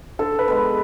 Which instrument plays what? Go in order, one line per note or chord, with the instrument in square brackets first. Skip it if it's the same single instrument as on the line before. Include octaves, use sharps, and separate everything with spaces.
[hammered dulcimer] D3 [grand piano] A4
[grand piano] B4
[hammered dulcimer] G#3 B3